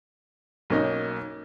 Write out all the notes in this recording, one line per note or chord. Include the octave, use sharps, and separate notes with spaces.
B1 A#3 C#4 D#4